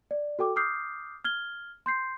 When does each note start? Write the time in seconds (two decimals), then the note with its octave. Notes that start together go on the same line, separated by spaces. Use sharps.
0.11 D5
0.39 F#4 A4 G5 D6
0.56 D6 D#6 F6 G6 C7
1.24 F6 G#6 G7
1.86 C6 G6 C7